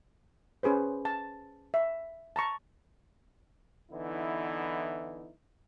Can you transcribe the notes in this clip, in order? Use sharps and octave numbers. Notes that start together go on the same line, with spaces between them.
C#4 G#4 B4 C5
A5
E5
A5 A#5 C#6
D3 E3 B3 D#4 E4